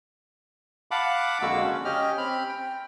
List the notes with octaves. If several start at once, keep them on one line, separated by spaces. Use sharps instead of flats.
F5 F#5 A5 B5 D6
F2 D3 G#3 A#3 F#4 E6
C#3 C#4
C#4 G4 D#5 F6
C4 B5 F6
G5